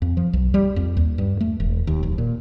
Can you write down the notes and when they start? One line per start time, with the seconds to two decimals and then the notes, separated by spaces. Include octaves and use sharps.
0.02 F2
0.17 F3
0.33 B1
0.54 G3
0.76 F2
0.97 D#2
1.18 G2
1.41 A3
1.60 E1
1.87 D#2
2.03 D1
2.18 A#2